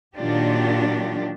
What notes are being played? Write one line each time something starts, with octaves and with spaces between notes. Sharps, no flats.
A#2 D#3 F#3 D4 F4 G4